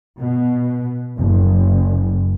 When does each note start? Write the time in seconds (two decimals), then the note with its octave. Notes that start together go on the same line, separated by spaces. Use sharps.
0.19 B2
1.18 F#1